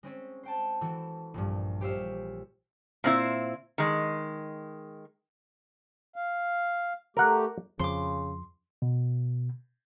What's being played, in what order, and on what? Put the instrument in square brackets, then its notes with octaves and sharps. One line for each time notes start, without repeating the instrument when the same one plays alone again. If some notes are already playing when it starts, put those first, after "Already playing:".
[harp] G#3 C4 C#4
C5 G5 A5
E3 C4 F#4 A4
A#1 G2
G4 G#4 C5 C#5 E5 F5
[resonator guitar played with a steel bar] A#2 C4 E4
D#3 G#3
[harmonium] F5
[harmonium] A3 G4 [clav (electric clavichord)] A#4 F#5
[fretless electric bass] F2 F3 [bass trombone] C#3 [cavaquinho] C6 D6
[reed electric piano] B2